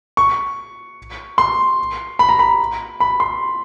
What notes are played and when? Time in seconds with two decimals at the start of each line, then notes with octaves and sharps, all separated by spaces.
0.17 C#6
1.38 C6
2.19 B5
2.29 A#5
2.39 B5
3.00 B5
3.20 C6